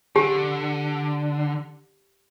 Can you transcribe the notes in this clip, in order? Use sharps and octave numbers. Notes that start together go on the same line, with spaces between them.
D3 G4